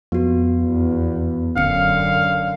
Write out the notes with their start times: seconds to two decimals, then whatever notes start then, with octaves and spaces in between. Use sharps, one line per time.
0.12 F2 B3 F#4
0.61 E2
1.56 D1 F#2 D3 C#4 F5 C#7